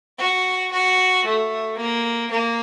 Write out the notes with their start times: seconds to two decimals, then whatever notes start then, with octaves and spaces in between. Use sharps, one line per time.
0.19 F#4
0.72 F#4
1.25 A3
1.78 A#3
2.31 A#3